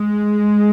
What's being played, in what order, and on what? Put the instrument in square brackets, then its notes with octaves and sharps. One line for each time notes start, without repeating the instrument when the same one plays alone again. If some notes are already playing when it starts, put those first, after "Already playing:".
Already playing: [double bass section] G#3